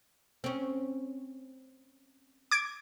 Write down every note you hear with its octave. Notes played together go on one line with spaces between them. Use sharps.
C4 C#4
D6 G#6 D7